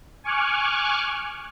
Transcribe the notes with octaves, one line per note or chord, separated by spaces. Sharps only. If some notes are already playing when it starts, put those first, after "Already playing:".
G#5 C#6 D6 F6 F#6